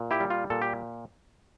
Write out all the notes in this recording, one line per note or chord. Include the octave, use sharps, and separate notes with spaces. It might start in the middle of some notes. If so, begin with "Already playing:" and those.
Already playing: A#2
E4 G4
G3
F4
A#2 A4
G4